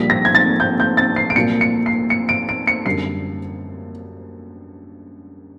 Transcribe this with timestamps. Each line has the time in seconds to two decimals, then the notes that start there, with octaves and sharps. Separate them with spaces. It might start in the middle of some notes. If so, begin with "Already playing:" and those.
Already playing: A#1 A#2 G3 B6
0.10 A#6
0.25 G#6
0.35 A6
0.60 G6
0.80 G6
0.97 A6
1.16 C7
1.30 D7
1.36 C2 A#2 F#3 C#7
1.61 C#7
1.86 C7
2.10 C#7
2.29 D7
2.49 D7
2.67 C#7
2.86 F#2 D3 G3 C7